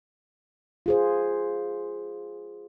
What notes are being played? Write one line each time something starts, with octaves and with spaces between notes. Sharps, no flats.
F4 G#4 C5